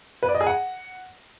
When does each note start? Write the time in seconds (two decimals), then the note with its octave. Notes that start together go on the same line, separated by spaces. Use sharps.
0.23 B4
0.29 D5
0.35 D#5
0.41 G#4
0.47 F#5